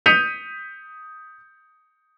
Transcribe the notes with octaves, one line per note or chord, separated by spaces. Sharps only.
D#6 G6 B6 C#7 D#7 F7